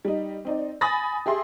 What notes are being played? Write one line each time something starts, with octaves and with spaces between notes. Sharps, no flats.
G3 D#4
C4 D#4 D5
G#5 B5 D#6 A6 A#6
G4 G#4 E5 C6